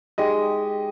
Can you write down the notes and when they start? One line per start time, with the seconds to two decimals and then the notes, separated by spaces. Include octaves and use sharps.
0.18 G#3 D#4 G4 D#5